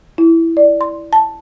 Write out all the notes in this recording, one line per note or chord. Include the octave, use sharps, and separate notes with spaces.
E4
D5
C6
A5